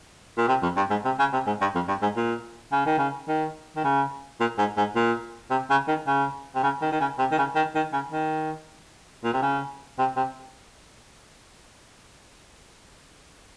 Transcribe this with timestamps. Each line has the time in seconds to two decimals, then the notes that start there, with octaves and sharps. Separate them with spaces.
0.38 A#2
0.48 C3
0.63 F2
0.77 G2
0.90 G#2
1.05 C3
1.19 C#3
1.33 C3
1.47 G#2
1.61 G2
1.75 F2
1.88 G2
2.02 G#2
2.17 A#2
2.72 C#3
2.86 D#3
2.98 C#3
3.28 D#3
3.76 D#3
3.84 C#3
4.40 A#2
4.58 G#2
4.77 G#2
4.96 A#2
5.51 C3
5.70 C#3
5.88 D#3
6.07 C#3
6.55 C3
6.63 C#3
6.82 D#3
6.92 D#3
7.00 C#3
7.19 C3
7.32 D#3
7.38 C#3
7.55 D#3
7.75 D#3
7.93 C#3
8.12 D#3
9.24 A#2
9.33 C3
9.42 C#3
9.99 C3
10.16 C3